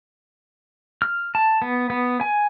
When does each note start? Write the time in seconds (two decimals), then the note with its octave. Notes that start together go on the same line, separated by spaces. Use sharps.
1.02 F6
1.35 A5
1.62 B3
1.90 B3
2.21 G#5